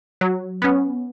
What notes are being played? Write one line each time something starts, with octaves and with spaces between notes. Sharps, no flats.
F#3
B3 C#4